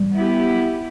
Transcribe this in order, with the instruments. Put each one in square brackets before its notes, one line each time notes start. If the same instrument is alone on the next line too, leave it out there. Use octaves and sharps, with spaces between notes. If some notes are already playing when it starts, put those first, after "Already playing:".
Already playing: [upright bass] G3
[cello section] B3 E4 G4